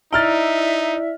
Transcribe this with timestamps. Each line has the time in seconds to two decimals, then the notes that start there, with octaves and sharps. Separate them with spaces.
0.13 D#4 E4 D5 E5 A#5 F6 A6